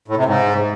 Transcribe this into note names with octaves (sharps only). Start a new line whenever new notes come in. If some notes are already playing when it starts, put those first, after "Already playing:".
A2
C3
G#2